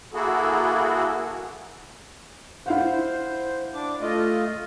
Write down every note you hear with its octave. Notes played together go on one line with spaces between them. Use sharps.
A#3 E4 F#4 G#4 A4
E4 C5 F5 F#5
D4 D6
A3 F4 D#5